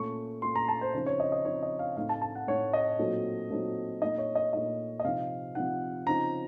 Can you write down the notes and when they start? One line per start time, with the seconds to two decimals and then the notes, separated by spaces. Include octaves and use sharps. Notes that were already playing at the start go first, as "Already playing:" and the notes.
Already playing: A#2 A3 C#4 C#6
0.42 A#2 A3 C#4 C6
0.56 A#5
0.68 A5
0.81 C5
0.94 C#3 F3 C4 D#4 C5
1.06 C#5
1.20 D#5
1.32 D#5
1.45 C#3 F3 C4 D#4 C#5
1.63 D#5
1.79 F5
1.96 A2 A3 C4 D#4 F5
2.09 A5
2.22 A5
2.35 F#5
2.47 A2 A3 C4 D#4 C#5
2.73 D#5
2.99 A#2 F#3 A3 C4 D#4
3.51 A#2 F#3 A3 C4 D#4
4.01 A#2 A3 D#4 D#5
4.18 C#5
4.35 D#5
4.53 A#2 A3 D#4 D#5
5.00 D#5
5.04 C3 F3 C4 D#4 F5
5.55 C3 F3 C4 D#4 F#5
6.07 C#3 F3 C4 D#4 A#5